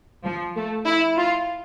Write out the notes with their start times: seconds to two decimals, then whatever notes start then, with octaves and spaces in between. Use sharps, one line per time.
0.25 F3
0.56 A3
0.87 E4
1.17 F4